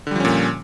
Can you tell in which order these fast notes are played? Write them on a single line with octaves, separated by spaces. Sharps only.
D3 G3 F3 C#4 A#2